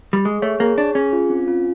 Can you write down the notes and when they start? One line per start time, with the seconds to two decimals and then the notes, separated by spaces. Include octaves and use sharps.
0.13 G3
0.25 G#3 G#4
0.42 A3 C#5
0.60 A#3 G#4
0.78 D4 C#5
0.95 C#4 G#4
1.13 F4
1.30 C4
1.48 F4